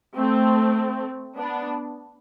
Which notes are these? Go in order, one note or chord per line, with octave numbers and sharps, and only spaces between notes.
A3 C4
B3 D4